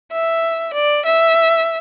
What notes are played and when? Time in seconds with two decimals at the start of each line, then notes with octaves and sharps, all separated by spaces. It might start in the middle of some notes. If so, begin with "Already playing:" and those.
0.12 E5
0.73 D5
1.05 E5